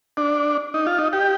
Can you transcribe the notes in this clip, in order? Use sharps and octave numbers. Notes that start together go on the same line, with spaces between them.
D4
D#4
F4
D#4
G4